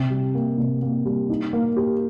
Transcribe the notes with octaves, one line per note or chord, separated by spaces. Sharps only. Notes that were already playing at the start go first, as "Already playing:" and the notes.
Already playing: C3
G3
A#3
C3
A#3
G3
D#4
A#3
G4